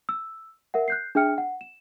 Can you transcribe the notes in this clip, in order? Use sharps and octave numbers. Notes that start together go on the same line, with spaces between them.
E6
A#4 E5 F#5
F#6 G6 C7
D4 G#4 E5 G5 F6 C#7
F#5
E7